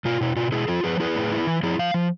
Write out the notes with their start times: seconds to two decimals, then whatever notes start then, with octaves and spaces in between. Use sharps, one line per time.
0.05 B2 F4
0.21 B2 E4
0.36 B2 F4
0.52 B2 E4 G#4
0.68 F3 F4 A4
0.84 F3 G#4 B4
1.00 E4 G#4 B4
1.16 A2
1.32 E4
1.47 E3
1.63 F3 E4 G#4
1.79 F3 F5
1.94 F3